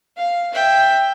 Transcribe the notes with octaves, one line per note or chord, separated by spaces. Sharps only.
F5
E5 G5